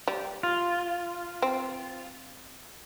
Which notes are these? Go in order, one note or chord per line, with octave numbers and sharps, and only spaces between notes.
G3
F4
C4